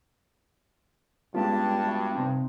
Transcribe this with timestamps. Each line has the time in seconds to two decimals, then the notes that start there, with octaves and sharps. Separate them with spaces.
1.35 G2 G#3 B3 C#4 F4 G4 A5
1.83 F#4 D5 E5
2.13 C3 C4 D#4